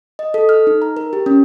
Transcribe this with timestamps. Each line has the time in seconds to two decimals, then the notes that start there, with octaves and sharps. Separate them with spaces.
0.19 D#5
0.34 A4
0.49 F6
0.67 D#4
0.82 A#5
0.97 A#4
1.13 G4
1.26 C#4